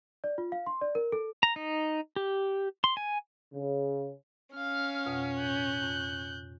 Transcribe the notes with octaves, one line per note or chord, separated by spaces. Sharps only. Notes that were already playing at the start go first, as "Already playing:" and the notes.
D5
F4
F5
C6
D5
A#4
A4
A#5
D#4
G4
C6
G#5
C#3
C#4 F5 F6
F2 B2 F#5
A2 F#6 G6
F2